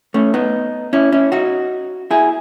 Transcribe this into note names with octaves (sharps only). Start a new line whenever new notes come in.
A3 C#4
B3 D#4
C#4 E4
C#4 E4
D#4 F#4
E4 G#4